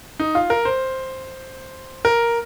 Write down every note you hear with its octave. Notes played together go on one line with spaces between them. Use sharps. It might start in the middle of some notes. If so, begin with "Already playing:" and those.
D#4
F4
A#4
C5
A#4